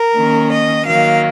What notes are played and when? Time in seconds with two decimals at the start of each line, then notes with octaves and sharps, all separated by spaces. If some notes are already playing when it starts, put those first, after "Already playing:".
Already playing: A#4
0.16 D#3 A#3 C#4
0.51 D#5
0.84 D#3 F#3 A#3 F5